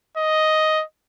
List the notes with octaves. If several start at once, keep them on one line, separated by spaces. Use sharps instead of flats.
D#5